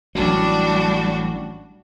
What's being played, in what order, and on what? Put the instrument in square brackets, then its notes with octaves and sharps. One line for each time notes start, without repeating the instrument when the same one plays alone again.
[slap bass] A1 F#3 [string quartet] G3 D4 F#4